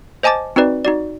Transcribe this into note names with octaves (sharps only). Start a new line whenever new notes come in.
C5 D#5 G#5 A5 D6 A6
C4 D#4 F#4 B4 D5
D#4 F#4 D5